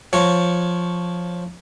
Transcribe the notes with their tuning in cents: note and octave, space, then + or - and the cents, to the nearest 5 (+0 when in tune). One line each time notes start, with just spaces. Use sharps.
F3 +5 C#5 +0